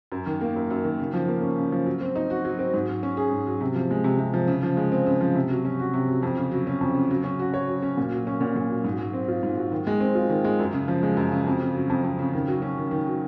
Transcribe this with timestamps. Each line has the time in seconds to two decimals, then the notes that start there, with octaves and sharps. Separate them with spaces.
0.12 F#2
0.26 D#3
0.41 A#3
0.56 F#2
0.70 F#2
0.84 D#3
0.99 C#3
1.13 F3
1.28 A#3
1.42 C#4
1.57 C#3
1.72 F3
1.86 F#3
2.01 C4
2.16 D#4
2.30 F#4
2.45 F#3
2.59 C4
2.74 G#2
2.89 F#3
3.03 C#4
3.17 G#4
3.32 G#2
3.47 F#3
3.61 C3
3.75 F3
3.90 G#3
4.04 C3
4.19 C3
4.34 F3
4.48 C#3
4.63 F3
4.77 G#3
4.92 C4
5.07 C#3
5.21 F3
5.35 C3
5.50 F#3
5.65 C#4
5.79 F#4
5.93 C3
6.08 F#3
6.23 F2
6.37 C#3
6.52 F#3
6.67 C#4
6.81 F2
6.95 C#3
7.11 F#3
7.24 C#4
7.39 F#4
7.54 C#5
7.68 F#3
7.82 C#4
7.97 A#2
8.12 F#3
8.27 C#4
8.41 A#2
8.56 A#2
8.70 F#3
8.84 G#2
8.98 F#3
9.13 C4
9.28 F4
9.43 G#2
9.57 F#3
9.72 D#3
9.87 G#3
10.00 C4
10.15 F4
10.29 D#3
10.44 G#3
10.59 F#2
10.73 C#3
10.88 F3
11.03 G#3
11.17 F#2
11.32 C#3
11.47 F2
11.61 C#3
11.75 F#3
11.89 F2
12.04 F2
12.19 C#3
12.33 D#3
12.48 F#3
12.62 C#4
12.77 D#3
12.91 D#3
13.07 F#3